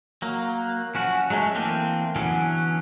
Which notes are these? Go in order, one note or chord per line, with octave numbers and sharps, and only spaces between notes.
F#3 A#3
F3 C#4 F#4
F#3 G#3 A3 C#4
E3 A3 A#3 C4 D4
D3 E3 F#3 B3 C#4